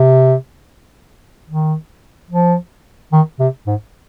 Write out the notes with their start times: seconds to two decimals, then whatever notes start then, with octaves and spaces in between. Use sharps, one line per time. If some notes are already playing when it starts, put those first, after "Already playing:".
Already playing: C3
1.49 D#3
2.30 F3
3.12 D#3
3.39 C3
3.66 G#2